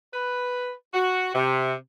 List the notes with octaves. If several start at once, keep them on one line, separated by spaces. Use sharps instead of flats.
B4
F#4
C3